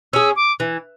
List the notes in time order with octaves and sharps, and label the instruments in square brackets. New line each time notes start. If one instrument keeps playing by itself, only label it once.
[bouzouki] C#4 G#4 [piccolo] E6
[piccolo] D6
[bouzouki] E3